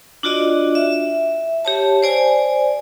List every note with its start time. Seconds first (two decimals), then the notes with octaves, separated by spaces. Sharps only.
0.23 D4 F4 F#4 D5 D#5
0.75 E5
1.65 G4 C#5 A5
2.03 C5 D5 G#5